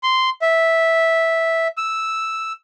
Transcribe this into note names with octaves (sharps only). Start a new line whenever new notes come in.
C6
E5
E6